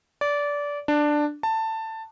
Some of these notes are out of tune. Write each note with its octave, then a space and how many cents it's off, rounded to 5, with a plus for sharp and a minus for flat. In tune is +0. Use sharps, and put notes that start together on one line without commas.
D5 -20
D4 +10
A5 +15